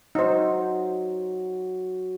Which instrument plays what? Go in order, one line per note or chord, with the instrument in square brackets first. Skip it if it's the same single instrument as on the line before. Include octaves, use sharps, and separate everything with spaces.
[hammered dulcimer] F#3 [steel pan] D#4 C5